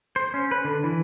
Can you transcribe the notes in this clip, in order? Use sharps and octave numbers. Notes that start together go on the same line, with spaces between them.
C5
C#4
B4
D3
E3